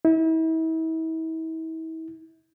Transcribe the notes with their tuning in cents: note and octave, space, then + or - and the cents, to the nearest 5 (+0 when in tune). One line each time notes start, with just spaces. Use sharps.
E4 -40